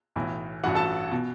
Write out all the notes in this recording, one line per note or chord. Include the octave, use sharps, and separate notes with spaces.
B1 A2 E3
A1 G2 E3 F#4 F#5
A4 A5
B2